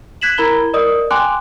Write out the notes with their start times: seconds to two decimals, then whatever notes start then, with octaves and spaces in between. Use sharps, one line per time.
0.21 F#6 G#6 B6 E7 F#7
0.38 E4 A#4 A#5 B5 G#6 G7
0.74 A#4 D5 D#5 D#6
1.11 G5 G#5 C6 D6 F#6